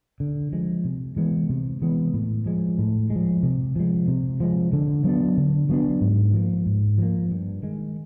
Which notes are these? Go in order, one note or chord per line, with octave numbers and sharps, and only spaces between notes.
D3
F3 G#3
C3
E3 G#3 B3
C3
E3 G#3 B3
A2
F3 G#3
A2
G#3
F3
C3
F3 G#3
C3
F3 G#3
D3
F#3 B3 D4
D3
F#3 B3 D4
G#2
F3 A#3
G#2
F3 A#3
G2
D#3 G#3